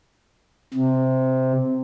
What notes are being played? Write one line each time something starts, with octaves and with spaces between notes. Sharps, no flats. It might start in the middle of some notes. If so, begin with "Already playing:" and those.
C3